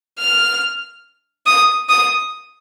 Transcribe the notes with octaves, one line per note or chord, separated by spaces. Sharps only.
F6
D#6
D#6